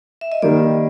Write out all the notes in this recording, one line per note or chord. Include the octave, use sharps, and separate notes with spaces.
E5
D#5
D#3 G3 A#3 D5